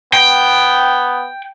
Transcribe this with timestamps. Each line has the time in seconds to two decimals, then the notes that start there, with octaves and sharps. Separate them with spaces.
0.13 B3 G5